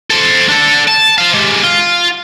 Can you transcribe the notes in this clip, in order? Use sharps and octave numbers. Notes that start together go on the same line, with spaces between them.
A4 C5
D4 A4
A5
C5 F5
G#3 G4
F4